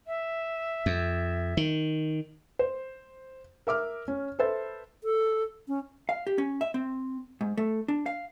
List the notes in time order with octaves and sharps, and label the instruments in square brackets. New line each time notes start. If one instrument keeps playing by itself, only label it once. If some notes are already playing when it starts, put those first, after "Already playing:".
[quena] E5
[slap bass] F2
D#3
[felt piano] C5
A#4 E5 D6 F6
C#4
A4 B4 C5 E5 A6
[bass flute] A4
C#4
[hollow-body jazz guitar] F5
G4
C#4
E5
C4
G#2
A3
D4
F5